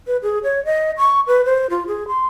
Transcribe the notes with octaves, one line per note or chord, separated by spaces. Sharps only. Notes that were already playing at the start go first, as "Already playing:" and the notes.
B4
G#4
C#5
D#5
C#6
B4
C5
F4
G#4
C6